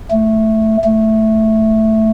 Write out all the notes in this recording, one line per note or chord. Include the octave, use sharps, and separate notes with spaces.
A3
A3